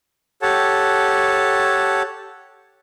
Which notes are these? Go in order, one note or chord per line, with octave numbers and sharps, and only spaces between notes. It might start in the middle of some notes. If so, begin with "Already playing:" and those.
G4 A4 C#5 F#5 A5